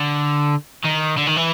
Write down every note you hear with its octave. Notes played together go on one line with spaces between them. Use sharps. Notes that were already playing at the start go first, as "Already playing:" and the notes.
Already playing: D3
D#3
D3
D#3
E3